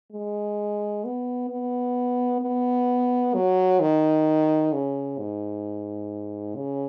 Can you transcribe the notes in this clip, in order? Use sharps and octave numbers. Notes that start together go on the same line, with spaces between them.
G#3
B3
B3
B3
F#3
D#3
C#3
G#2
C#3